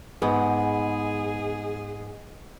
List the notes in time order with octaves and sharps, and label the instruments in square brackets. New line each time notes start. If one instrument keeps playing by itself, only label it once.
[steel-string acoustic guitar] G#2 [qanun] B3 [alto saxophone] G#4